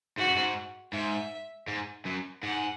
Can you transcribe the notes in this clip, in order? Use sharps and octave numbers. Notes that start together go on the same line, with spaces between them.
G#2 F#4
F#2
G#2
G#2 E5
G#2
F#2
G#2 F#5